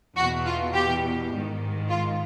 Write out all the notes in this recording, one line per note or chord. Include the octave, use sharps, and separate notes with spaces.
E2 B2 F#4
F4
G4
G#2 D#3
F4